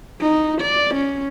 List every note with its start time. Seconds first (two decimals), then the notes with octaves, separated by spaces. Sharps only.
0.21 D#4
0.61 D5
0.95 C#4